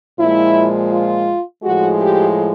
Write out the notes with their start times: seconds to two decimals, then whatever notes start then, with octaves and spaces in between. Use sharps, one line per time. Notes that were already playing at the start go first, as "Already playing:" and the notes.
0.19 A#2 F3 G#3 E4
0.92 F4
1.63 A2 F3 G#3 F#4
1.99 G4